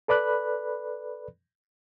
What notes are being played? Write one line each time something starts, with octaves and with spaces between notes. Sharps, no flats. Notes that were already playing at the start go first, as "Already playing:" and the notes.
A4 B4 D5 B5 F#6